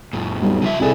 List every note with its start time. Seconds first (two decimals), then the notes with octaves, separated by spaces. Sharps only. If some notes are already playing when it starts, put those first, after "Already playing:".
0.13 F#2 A#2
0.42 B1 G3
0.62 C#3 F3 E5
0.80 C2 C3 E4 G#4 A4 D5